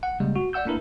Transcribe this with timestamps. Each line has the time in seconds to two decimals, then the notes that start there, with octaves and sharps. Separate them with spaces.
0.03 F#5
0.20 C#3 G3 G#3 A#3
0.36 F#4
0.53 D5 E5 F#5 E6 G6
0.65 A3 A#3 D4 E4 A#4 B4